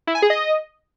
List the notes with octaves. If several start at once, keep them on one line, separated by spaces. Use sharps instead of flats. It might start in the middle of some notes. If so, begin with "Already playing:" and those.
E4
G#5
G#4
D#5